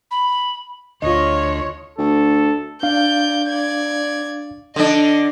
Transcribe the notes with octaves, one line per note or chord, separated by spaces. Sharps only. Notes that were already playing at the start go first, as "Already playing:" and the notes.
B5
D2 F4 C#5 D#5
D2 A4
D4 D5 F5 G6
D5 G#6
D3 D4 D#5